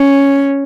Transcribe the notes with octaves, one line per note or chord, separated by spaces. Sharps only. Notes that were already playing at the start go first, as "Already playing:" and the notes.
Already playing: C#4